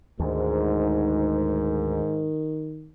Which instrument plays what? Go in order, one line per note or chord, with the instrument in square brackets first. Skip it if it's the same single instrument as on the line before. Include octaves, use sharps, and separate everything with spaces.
[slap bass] D2 [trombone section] G#2 [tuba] D#3